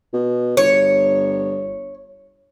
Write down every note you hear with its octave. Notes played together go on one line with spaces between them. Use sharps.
B2
G1 C#5